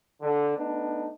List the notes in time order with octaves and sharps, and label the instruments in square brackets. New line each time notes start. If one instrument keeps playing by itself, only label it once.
[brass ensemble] D3
A3 B3 D4 D#4